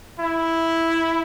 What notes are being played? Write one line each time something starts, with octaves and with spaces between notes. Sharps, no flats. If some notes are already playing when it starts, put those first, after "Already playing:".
E4